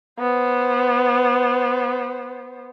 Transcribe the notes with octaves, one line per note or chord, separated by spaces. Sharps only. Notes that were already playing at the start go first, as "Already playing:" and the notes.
B3 C5